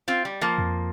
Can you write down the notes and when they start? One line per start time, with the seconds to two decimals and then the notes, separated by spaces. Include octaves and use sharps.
0.08 C4 F4
0.25 G3
0.41 F3 A#3
0.58 F2